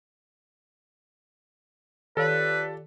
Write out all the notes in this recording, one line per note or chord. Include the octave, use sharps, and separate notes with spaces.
D#3 F4 G4 A4 B4 C#5 D5 F5